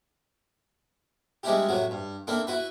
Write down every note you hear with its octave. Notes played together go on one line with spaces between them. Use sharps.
G3 G#3 C4 D4 E4 G4
A2 C3 F#3 F#4
G2
A#3 C4 D4 E4 A4
E4 F#4 B4